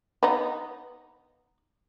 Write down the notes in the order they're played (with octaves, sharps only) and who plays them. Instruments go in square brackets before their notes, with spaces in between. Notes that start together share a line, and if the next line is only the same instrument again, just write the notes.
[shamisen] B3 D#4